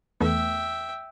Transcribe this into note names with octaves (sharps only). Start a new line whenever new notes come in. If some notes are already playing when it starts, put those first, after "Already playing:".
E2 A3 B3 E5 G5